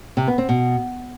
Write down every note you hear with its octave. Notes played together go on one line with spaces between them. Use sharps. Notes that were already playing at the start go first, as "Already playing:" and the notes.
C3
B3
C4
B2